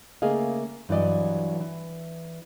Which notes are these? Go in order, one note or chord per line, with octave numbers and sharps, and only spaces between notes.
C#3 A3 A#3 G#4 D#5 F5
G2 E3 F#3 D5 D#5
E3